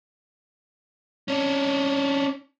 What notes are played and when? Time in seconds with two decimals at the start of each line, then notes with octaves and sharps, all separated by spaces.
1.28 C#4 D4